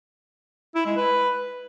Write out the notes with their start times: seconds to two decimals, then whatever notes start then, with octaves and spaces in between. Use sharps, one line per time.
0.75 E4
0.86 G#3
0.96 B4